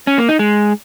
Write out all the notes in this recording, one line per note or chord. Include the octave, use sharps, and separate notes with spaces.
C#4
A#3
D#4
G#3